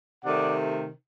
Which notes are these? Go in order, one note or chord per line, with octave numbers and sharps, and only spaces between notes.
C3 D#3 A3 D5 F#5